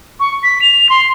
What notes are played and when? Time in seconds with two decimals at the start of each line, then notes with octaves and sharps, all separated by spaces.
0.20 C#6
0.43 B6
0.62 F7
0.89 C6